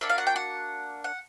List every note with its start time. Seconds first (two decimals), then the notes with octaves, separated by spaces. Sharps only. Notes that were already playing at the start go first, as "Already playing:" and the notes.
0.01 A#3 D4 F#4 E5
0.09 F5
0.18 F#5
0.27 G5
0.36 F#5
1.04 F#5